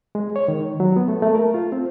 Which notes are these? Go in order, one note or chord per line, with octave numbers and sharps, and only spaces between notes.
G#3
C#5
D#3
F#3
B3
A3
A3
A#4
F4
C4